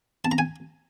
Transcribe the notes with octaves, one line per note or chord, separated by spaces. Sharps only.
A5
A#5
G#5